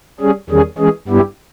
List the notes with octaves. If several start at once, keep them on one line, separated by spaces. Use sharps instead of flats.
G3 C#4 G#4
E2 D#3 G3 C#4 G#4
E3 G#3 C#4 G#4
G2 G3 B3 E4 G4